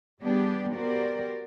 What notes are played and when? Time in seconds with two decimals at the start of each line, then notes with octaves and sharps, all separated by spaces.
0.21 G3 B3 D4 G4 G#4
0.75 B3 F#4 G4 A#4 C5 D5